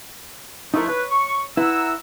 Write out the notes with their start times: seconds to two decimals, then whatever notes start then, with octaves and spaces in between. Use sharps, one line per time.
0.74 F3 A3 D#4 E4 A#4
0.88 B4 C#5
1.10 C#6
1.57 E4 B4 F#5 A#5 E6